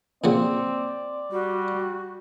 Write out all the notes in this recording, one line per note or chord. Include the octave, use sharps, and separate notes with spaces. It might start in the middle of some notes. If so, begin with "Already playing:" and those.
A#2 C#3 F#3 C4 D5
G3 F#4